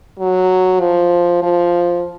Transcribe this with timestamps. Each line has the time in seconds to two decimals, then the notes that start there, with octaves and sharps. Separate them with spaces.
0.19 F#3
0.80 F3
1.42 F3